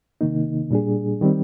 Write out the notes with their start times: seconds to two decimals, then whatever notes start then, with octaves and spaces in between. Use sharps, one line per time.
0.21 C3 D#3 A#3 D#4
0.71 A#2 G3 D4 G#4
1.21 D#3 G3 C4